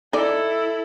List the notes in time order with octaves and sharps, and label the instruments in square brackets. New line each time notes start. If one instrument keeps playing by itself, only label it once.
[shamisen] D#4 D5 [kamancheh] E4 A4